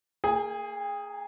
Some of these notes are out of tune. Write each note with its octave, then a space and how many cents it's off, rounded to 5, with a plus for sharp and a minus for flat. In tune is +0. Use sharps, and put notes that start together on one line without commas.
A#3 -30 G#4 +0 G5 +45